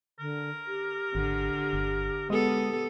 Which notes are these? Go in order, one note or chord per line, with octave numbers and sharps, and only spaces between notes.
D3 A#4
G4
G#1 D3
G1
G#3 B3 A4 D#6